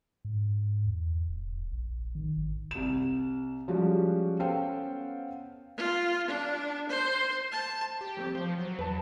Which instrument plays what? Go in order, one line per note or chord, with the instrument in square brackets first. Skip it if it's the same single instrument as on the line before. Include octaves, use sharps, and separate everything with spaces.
[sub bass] G#2
E2
D#1
A#1
D#3
G#1
[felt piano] C2 E7
F3 G3 G#3 C#4 F#4
B3 C#4 A4 C5 F5 G5
[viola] F4
D4
C5
A5
[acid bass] G4
[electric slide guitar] F2 A3 C4
[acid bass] F3 [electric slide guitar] C5
[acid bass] F#3
[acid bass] E2 [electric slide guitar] B4 A5